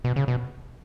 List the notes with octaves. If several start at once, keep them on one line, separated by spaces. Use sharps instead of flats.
B2
C#3
B2